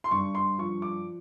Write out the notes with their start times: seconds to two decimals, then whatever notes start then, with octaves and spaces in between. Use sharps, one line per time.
0.04 C6
0.11 G2 C#6
0.35 C6
0.59 F3 C#6
0.82 D6